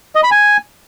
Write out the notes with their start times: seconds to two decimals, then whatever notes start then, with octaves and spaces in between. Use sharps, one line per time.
0.15 D#5
0.23 B5
0.31 G#5